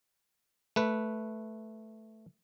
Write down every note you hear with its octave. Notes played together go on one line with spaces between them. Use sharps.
A3 B4